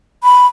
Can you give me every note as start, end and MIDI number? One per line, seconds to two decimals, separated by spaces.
0.23 0.46 83